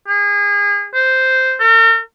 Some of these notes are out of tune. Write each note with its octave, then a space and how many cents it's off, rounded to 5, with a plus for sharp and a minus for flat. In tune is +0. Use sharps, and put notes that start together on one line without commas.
G#4 -30
C5 -5
A#4 -45